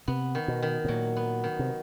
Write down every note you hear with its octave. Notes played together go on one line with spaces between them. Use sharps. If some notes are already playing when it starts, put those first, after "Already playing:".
C3 B3
D#3
B2
D#3
B2
A#2 F#3
B3
D#3
C3